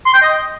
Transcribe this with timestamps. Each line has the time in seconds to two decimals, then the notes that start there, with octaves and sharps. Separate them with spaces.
0.05 C6
0.14 G5
0.22 D#5